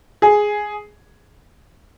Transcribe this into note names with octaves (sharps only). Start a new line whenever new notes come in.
G#4